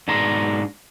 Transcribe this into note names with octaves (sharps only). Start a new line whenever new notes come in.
G#2 B2 D4 A5 A#5 C6